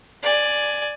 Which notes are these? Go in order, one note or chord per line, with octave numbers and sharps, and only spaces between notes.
D5 G#5